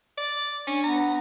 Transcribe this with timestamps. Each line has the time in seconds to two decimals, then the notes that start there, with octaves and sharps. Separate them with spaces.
0.18 D5
0.67 C#4 D4
0.84 B3 A#5